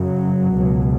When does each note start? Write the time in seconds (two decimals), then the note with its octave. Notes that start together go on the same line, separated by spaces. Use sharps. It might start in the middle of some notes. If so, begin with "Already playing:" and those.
Already playing: F#2 C#3 F#3
0.54 C#2 B2